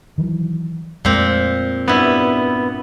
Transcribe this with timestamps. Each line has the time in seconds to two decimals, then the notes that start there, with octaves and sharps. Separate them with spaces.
0.18 D#3 E3 F#3
1.05 F2 A#2 G#3 A3 C4
1.88 G2 B3 E4